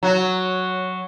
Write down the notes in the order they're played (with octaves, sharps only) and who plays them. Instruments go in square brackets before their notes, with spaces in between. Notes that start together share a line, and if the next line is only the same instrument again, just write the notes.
[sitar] F#3 F#4